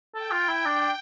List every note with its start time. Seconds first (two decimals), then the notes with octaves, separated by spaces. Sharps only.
0.14 A4 G5
0.31 F4
0.49 E4
0.65 D4